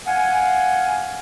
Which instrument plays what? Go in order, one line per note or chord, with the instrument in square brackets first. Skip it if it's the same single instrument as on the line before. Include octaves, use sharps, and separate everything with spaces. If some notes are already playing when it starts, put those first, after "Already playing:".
[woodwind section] F5 F#5 G#5